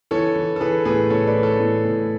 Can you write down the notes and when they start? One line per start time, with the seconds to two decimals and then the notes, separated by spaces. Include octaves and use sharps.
0.11 E3 A4 C#5
0.36 E3
0.56 A4
0.60 E3 G#4 B4
0.85 A2 G#4 B4
1.10 A2 A4 C#5
1.27 B4 D5
1.35 E3
1.43 A4 C#5
1.60 A2
1.85 A2